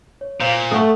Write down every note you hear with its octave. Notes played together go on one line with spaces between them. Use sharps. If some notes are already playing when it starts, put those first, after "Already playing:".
C#5
A#2 C5 F5 G6
A3 A4 F#5 C#6 D#6